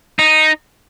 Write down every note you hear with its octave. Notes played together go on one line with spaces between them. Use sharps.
D#4